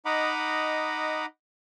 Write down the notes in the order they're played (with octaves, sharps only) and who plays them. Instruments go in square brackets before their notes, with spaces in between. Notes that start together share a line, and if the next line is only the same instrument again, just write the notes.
[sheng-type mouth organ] D#4 D#5 F#5 A#5 B5 D6